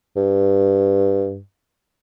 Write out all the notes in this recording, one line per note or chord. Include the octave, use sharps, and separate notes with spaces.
G2